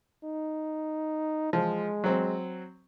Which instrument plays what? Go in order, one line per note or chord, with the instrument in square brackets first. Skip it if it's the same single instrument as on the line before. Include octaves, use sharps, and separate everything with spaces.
[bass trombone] D#4
[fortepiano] F3 [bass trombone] G#3
[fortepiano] F#3 C4